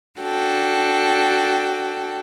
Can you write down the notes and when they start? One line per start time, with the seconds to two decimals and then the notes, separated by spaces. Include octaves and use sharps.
0.19 D4 F#4 A4 G5